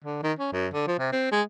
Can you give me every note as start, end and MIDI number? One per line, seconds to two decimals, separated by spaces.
0.04 0.21 50
0.23 0.33 51
0.39 0.52 61
0.52 0.68 42
0.73 0.87 50
0.87 0.95 53
0.99 1.11 48
1.12 1.27 60
1.32 1.42 56